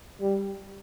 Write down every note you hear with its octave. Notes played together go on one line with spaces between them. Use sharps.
G3